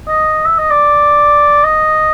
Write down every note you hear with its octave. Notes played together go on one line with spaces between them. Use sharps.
D#5
E5
D#5
D5
D#5